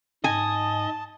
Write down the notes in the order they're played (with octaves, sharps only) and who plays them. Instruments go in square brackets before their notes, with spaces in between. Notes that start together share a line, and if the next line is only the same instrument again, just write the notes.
[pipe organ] G#2 [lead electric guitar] D#5 [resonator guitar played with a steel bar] G#5 [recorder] A5